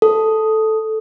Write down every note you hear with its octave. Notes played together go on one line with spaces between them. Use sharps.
A4